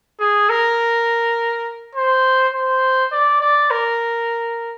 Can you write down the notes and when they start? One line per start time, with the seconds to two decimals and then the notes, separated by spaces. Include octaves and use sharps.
0.20 G#4
0.50 A#4
1.96 C5
2.53 C5
3.12 D5
3.41 D5
3.71 A#4